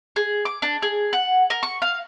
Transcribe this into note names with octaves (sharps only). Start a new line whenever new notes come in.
G#4
D6
D4
G#4
F#5
A#4
C#6
F5